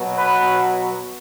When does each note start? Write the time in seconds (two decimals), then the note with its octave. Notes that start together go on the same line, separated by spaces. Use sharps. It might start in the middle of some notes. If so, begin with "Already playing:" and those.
Already playing: B2 F#3
0.17 B4